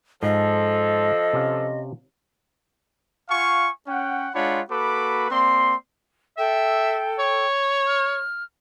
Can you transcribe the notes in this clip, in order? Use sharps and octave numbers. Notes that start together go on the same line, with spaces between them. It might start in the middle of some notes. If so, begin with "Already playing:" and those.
G#2 F3 A4 D#5
C3 C#4 F5
F4 F5 F#5 G#5 C#6
C#4 F#5 G5
G#3 D4 F4 C#5 F#5 B5
A#3 F#4 A4 B4 B5 D6
A#3 C4 D5 C6
A4 E5 G5
C#5
F6